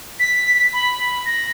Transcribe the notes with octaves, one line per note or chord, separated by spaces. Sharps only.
B6
B5
A#6